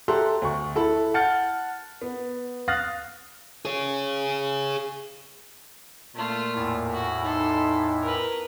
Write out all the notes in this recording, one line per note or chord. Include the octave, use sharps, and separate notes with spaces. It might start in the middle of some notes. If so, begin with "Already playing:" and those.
G4 A4 E5 A#5 C6 F#6
D2 C#6
E4 A4 B5
F#5 A5 F6 G6 A6 C#7
B3
F5 D#6 F6 F#6 A6 A#6
G#4 C#5
A#2 A3 F4
E2 A2 E4
F#4
D#4 A4 C6
A#4 B4